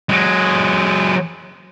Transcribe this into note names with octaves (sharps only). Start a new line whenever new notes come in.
F#3 G#3